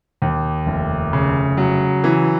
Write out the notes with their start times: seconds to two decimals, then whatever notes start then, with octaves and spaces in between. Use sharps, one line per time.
0.22 D#2
0.66 F1
1.13 C#3
1.57 F#3
2.04 E3